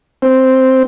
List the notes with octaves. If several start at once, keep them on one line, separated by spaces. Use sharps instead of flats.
C4